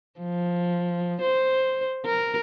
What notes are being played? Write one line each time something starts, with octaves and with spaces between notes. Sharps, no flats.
F3
C5
A#4